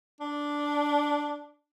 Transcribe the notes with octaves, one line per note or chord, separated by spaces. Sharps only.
D4